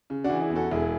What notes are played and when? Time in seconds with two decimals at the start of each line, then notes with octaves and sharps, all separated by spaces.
0.10 C#3
0.24 D4 F#4
0.30 E3
0.40 E4 G#4
0.50 E2
0.56 F#4 A4
0.71 E1 E4 G#4